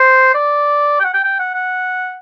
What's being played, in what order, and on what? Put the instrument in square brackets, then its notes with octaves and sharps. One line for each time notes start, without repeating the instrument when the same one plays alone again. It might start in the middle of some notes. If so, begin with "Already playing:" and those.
Already playing: [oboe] C5
D5
G5
F#5
G5
G5
F#5
F#5